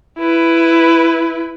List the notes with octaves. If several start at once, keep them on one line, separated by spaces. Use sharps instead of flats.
E4 B4